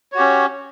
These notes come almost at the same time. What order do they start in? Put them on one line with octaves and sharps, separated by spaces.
C#5 F#4 G4 C#4